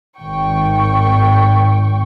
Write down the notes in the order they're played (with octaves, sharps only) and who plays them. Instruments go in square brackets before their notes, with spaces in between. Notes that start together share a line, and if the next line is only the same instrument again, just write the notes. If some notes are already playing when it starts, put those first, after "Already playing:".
[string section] G#1 G5 C#6